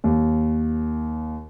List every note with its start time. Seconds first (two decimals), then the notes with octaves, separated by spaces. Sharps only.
0.04 D#2